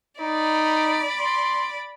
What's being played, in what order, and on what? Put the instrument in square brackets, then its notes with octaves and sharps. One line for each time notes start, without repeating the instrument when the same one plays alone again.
[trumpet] D#4 [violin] D5 B5
[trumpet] C6